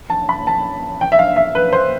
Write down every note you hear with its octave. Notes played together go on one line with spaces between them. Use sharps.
A5
B5
A5
G5
E5
F5
E5
B4
C5